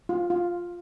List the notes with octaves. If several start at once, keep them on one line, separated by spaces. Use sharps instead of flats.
F4
F4